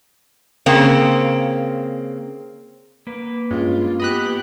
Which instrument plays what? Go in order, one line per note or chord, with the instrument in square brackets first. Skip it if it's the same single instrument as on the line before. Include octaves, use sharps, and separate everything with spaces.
[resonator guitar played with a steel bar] C#3 A#3 C4
[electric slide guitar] A#3 B4
[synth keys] G2 G#3 C#4 [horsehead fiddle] F4
[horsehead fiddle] B3 G4 [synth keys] D#5 B5 F#6